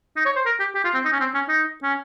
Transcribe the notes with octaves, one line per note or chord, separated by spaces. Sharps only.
D#4
C#5
C5
A#4
G4
G4
F4
C4
D#4
C#4
C4
C#4
D#4
C#4